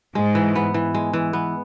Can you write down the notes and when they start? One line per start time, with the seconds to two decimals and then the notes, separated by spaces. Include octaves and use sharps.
0.15 G#2 G#3
0.35 E3
0.56 B3
0.74 E3
0.94 G#3
1.13 E3
1.33 B3